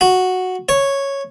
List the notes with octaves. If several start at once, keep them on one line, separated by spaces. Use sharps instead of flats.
F#4
C#5